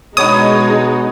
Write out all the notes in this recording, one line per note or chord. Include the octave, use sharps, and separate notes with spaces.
B2 G#3 B3 D4 D#4 C#5 D#6